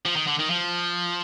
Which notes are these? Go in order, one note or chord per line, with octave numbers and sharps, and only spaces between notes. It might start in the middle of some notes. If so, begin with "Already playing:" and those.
F3
D#3
D3
D#3
F3